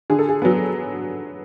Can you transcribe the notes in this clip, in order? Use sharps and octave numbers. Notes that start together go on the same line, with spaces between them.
D3 G#4
A4
G#4
F#3 B3